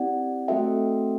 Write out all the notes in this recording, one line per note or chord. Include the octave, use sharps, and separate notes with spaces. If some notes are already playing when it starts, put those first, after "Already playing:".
Already playing: C4 E4 G4 D5 F#5
A3 C4 F#4 A4 E5 G5